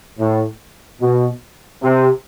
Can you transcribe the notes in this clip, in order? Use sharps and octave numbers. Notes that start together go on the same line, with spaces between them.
A2
B2
C3